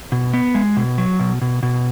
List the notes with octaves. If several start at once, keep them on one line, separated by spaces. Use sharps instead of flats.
B2
B3
G#3
B2
F#3
B2
B2
B2